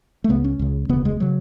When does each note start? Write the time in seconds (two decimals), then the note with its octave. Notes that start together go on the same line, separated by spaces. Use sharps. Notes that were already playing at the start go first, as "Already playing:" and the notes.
0.24 A3
0.29 C#2 C#3 B3
0.44 C#4
0.59 C#2 C#3
0.89 E1 D2 C#3 B3
1.05 G#3
1.20 C#3 F#3